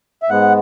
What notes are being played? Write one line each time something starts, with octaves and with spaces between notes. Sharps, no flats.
E5
G#2 G#3 B3 F#5